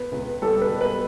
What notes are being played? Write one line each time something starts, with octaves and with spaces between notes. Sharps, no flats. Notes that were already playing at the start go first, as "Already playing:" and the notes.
Already playing: B3 B4
C#2
G3 A4
B4
B2
B4